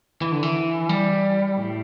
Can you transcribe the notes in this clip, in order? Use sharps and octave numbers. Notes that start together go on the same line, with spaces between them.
E3
D3
E3
G3
A2